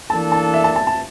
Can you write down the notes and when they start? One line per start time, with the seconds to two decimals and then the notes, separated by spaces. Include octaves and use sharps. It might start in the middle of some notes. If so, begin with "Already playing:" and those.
0.10 E3 A#3 D4 A4 A5
0.32 A5
0.54 E5
0.64 A5
0.76 A5
0.87 A5